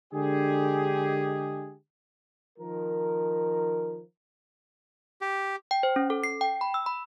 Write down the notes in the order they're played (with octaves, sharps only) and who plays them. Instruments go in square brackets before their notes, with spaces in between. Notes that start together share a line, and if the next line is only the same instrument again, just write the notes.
[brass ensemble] D3 G#3 G4 G#4
[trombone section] D#3 F3 A#4
[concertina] G4
[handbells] G5
C5
C#4
A4
C7
G5
B5
E6
B5